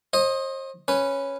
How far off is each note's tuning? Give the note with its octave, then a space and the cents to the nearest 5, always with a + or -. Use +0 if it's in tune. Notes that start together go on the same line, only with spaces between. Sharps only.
C5 +40 D#5 +0
C#4 -5 B4 +0